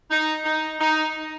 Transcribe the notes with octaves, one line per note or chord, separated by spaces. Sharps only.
D#4
D#4
D#4